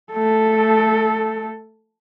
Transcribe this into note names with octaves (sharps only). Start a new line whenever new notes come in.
A3 A4